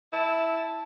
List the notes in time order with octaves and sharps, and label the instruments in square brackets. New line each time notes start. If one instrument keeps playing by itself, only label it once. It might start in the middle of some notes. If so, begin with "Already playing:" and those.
[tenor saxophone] E4 [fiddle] A5